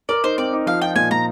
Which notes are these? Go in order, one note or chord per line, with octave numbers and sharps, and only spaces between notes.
A#4 D5
D#4 C5
C4 D5
D#4
F3 F5
F4 G5
A#2 G#5
A#2 A#5